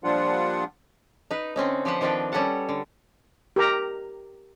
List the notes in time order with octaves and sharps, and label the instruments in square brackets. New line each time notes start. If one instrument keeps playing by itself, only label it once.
[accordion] A#2 F3 G3 D4 F4 F#5
[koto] D#4 B4
D3 C4 C#4 D#4
F3 G4 B4 C5 F#5
D#3 F3 C4 D4 B4 G5
G3 C#4 A4 B4 F#5 A5
D3
[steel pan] G4 A#4 A#5